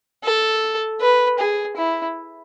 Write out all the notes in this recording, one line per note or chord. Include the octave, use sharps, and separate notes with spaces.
A4
B4
G#4
E4